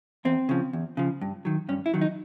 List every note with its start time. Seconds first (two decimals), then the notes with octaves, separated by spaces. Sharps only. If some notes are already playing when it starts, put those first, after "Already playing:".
0.25 E2 C4
0.49 C#3 F3
0.73 E2
0.97 C#3 F3
1.21 G2
1.45 D#3 F#3
1.69 G2 C#4
1.86 E4
1.94 D#3 F#3
2.01 D#4